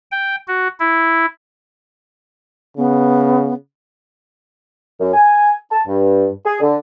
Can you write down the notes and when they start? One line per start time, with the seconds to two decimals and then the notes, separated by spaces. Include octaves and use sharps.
0.11 G5
0.48 F#4
0.80 E4
2.77 C#3 B3
5.00 F#2
5.13 G#5
5.70 A5
5.86 G2
6.44 G#4
6.60 D3